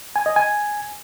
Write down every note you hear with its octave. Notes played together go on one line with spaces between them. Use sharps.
G#5
D#5
G#5